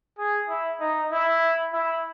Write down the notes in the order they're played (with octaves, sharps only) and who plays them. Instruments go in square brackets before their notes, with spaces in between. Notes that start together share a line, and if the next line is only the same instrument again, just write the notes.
[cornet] G#4
E4
D#4
E4
E4